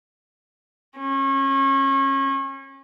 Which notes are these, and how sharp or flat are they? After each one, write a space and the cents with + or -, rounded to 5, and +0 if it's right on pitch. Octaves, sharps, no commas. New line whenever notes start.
C#4 -30